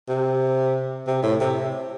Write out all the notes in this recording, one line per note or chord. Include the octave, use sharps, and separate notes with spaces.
C3
C3
A2
C3